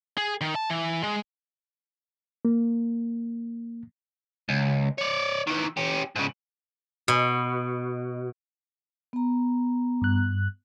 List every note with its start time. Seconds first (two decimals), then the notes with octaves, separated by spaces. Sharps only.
0.17 G#4
0.41 D#3
0.55 A5
0.70 E3
1.03 G#3
2.45 A#3
4.49 C#2
4.98 C#5 D5
5.47 D#3 E3
5.77 C#4 G4
6.16 G#2 C#3
7.08 B2
9.13 B3 A#5
10.02 G2 F#6